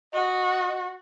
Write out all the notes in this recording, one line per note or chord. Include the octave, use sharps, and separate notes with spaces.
F#4 D#5